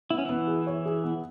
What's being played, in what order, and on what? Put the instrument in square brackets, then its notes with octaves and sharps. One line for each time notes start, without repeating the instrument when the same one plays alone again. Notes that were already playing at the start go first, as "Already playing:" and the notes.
[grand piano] B3 [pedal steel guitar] E4
[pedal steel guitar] C#4
[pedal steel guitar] E3 E4 [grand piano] B3
[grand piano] G#4
C#5
G#4
B3